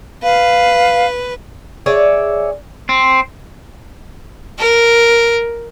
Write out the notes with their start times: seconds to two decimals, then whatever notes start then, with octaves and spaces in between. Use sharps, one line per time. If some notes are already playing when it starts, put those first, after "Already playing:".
0.23 B4 F5
1.86 G#4 C#5 D5 E5
2.89 C4
4.58 A#4